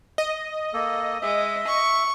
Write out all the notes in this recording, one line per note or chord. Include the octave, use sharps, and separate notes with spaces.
D#5
A#3 A4
G#3 E5
C#6